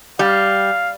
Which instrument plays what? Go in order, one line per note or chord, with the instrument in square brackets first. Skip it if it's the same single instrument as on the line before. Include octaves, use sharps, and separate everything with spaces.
[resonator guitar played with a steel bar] G3 [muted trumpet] F5